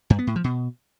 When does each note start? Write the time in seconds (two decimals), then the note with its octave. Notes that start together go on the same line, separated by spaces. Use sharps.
0.10 G2
0.19 B3
0.27 A2
0.36 F3
0.44 B2